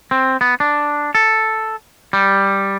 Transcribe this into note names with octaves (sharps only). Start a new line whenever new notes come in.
C4
B3
D4
A4
G3